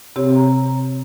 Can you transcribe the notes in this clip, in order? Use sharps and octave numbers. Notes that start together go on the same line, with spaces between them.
C3 C4 G4 C#5
A#5